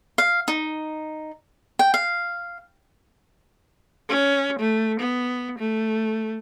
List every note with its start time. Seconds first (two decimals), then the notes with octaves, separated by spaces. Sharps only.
0.18 F5
0.48 D#4
1.79 G5
1.94 F5
4.09 C#4
4.59 A3
5.00 B3
5.59 A3